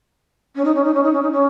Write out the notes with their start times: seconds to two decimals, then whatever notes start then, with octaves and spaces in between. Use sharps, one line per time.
0.56 C#4
0.65 D#4
0.75 C#4
0.84 D#4
0.94 C#4
1.03 D#4
1.13 C#4
1.22 D#4
1.32 C#4